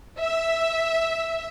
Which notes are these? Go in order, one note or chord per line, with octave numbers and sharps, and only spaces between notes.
E5